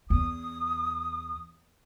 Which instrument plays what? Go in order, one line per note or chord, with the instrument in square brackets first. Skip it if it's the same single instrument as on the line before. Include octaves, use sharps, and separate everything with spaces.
[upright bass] E2 [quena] D#6